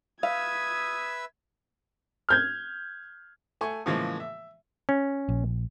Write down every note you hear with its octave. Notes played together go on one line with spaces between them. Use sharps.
B4 E5 F5 D#6 E6 G#6
F6 G6 G#6
A3 G#5 C#6
A2 C#3 E3 F3 G#3 A#3
E5
C#4
A#1